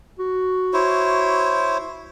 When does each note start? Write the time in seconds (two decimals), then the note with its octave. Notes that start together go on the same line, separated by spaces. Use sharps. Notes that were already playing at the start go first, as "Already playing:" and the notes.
0.19 F#4
0.73 E4 C5 C#5